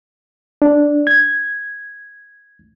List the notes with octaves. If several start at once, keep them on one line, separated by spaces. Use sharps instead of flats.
D4
G#6